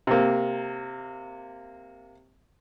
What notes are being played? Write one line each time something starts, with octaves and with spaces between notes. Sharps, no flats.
C3 A#3